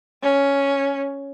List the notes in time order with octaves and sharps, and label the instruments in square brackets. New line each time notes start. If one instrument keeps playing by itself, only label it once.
[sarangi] C#4